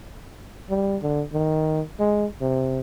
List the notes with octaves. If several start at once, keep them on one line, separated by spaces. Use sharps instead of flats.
G3
D3
D#3
G#3
C3